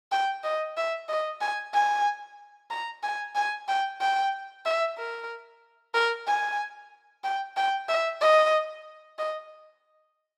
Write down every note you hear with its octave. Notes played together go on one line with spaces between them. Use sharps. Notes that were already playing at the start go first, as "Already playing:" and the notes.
G5
D#5
E5
D#5
G#5
G#5
A#5
G#5
G#5
G5
G5
E5
A#4
A#4
G#5
G5
G5
E5
D#5
D#5